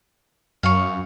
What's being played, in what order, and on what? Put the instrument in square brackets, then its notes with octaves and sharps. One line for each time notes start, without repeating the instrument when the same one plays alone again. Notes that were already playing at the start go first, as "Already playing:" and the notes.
[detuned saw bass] F#2 [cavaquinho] F5 C#6